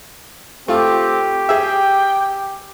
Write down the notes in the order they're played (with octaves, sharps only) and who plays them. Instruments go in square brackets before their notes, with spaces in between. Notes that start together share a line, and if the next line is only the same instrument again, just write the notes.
[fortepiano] A3 F4 [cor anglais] C4 [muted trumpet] G4
[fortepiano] G#4 E5 [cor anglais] G5